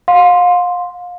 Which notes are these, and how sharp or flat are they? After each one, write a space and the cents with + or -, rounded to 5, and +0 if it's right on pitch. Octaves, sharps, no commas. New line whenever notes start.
F5 +35 C6 +0